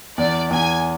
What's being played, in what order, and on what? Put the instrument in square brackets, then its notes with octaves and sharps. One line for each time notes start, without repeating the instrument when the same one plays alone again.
[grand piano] E2 [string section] D5
[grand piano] E2 [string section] G#5